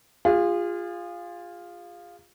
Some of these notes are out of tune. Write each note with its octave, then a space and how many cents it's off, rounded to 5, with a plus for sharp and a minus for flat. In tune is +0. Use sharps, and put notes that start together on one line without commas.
F4 +0 G#4 -35